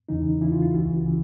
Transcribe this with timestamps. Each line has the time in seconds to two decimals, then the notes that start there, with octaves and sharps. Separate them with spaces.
0.09 E2 C#3 E3 D#4
0.41 E2 C#3 E3 E4
0.52 F4
0.62 F4
0.74 C#2 C#3 E3 F#4
1.06 C#3 E3